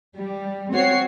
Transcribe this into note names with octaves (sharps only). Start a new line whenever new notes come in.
G3
C4 F#4 C#5 C7